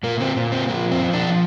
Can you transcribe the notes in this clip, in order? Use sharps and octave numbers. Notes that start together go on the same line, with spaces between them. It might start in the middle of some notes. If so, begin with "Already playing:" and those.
A#2 A#3
C4
A#2
C4
F3 A#3
C4
F3
D4